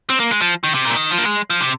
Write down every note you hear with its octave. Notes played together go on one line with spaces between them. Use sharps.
C4
A#3
G#3
F3
D#3
C3
A#2
C3
D#3
F3
A#3
G#3
F3
C3